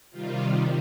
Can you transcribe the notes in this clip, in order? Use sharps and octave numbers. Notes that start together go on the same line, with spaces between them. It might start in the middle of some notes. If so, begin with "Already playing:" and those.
C3 D#3 G3 F4